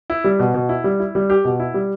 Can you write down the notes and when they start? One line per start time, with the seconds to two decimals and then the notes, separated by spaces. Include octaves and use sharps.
0.10 E4
0.24 G3
0.39 B2
0.54 B2
0.69 E4
0.84 G3
1.00 E4
1.15 G3
1.30 G4
1.45 B2
1.60 E4
1.74 G3